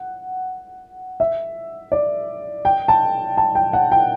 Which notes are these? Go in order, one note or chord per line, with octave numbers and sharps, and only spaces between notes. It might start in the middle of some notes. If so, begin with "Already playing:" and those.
Already playing: F#5
E5
D5
G5
A5
A5
G5
F#5
G5